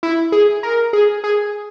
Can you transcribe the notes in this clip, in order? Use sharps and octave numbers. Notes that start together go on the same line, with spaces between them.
E4
G#4
A#4
G#4
G#4